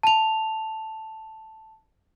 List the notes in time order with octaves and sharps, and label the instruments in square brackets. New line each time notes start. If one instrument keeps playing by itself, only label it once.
[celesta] A5 F7